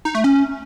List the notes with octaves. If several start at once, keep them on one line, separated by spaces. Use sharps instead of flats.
D#4
A3
C#4